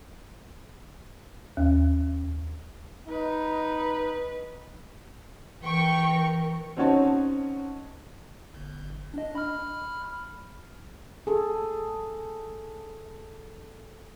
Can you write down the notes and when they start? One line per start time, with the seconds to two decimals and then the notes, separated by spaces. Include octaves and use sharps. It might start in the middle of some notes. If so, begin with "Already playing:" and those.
1.57 D#2
3.09 D#4 B4
5.63 E3 A#4 G5 C#6
6.77 C4 C#4 D#4 F#4 C#5 A5
8.54 G1
9.14 D4 D#5
9.35 B5 F6
11.27 G#4 A4